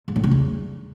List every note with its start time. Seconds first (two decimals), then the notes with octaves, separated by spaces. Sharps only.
0.08 G#2
0.16 A2
0.24 C#3
0.31 E2